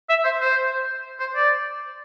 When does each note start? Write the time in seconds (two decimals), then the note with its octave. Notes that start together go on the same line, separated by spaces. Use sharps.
0.09 E5
0.24 C5
0.41 C5
1.20 C5
1.35 D5